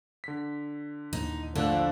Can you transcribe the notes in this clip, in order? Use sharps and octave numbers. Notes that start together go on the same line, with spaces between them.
D3 B6
D#2 A#2 E3 D#4
A#1 D3 F3 A3 E4 D5 F#6